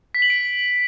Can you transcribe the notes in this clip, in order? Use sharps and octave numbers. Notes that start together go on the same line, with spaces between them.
B6
F#7
D7